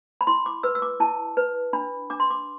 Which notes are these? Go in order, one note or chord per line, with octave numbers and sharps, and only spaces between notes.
B5
E4 C6
D6
B4 E6
E6
D6
E4 A5
B4
D4 B5
D4 D6
C6
D6